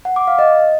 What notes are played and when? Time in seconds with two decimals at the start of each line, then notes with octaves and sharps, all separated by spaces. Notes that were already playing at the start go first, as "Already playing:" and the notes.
0.05 F#5
0.16 D6
0.27 F5
0.39 D#5